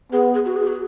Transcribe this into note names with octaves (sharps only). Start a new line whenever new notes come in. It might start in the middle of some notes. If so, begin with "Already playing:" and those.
B3 G#4
G#4
F#4
G#4
F#4